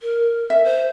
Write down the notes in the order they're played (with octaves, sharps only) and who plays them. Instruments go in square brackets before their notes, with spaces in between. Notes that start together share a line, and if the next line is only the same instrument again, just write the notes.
[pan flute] A#4
[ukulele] E5
[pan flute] C5